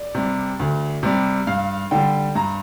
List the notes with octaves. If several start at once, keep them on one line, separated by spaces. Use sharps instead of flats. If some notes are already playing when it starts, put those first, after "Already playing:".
Already playing: D5
C3 G3
D2
C3 G3
G2 F5
D3 G3 G5
G2 A#5